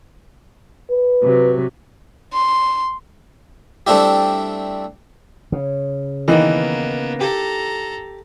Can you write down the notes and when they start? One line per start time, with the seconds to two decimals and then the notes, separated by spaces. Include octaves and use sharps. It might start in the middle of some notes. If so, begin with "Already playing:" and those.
0.90 B4
1.23 C3 F#3
2.33 C6
3.87 G3 A3 C4 D4 E4 G4
5.52 C#3
6.28 D#3 E3 A#3 B3 D#5
7.21 G4 A4 A#5